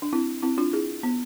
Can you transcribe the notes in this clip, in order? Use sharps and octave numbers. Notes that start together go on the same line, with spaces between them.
D4
C4 E4
C4 E4
D4 F4
E4 G#4
B3